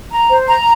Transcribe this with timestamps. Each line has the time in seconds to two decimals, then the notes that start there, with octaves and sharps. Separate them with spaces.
0.11 A#5
0.30 C5
0.48 A#5